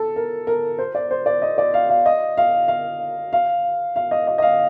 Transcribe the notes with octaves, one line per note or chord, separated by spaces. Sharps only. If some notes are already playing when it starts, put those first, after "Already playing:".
Already playing: A4
A#4
A#4
C5
D5
C5
D5
D#5
D5
F5
F5
D#5
F5
F5
F5
F5
D#5
D#5
D#5
F5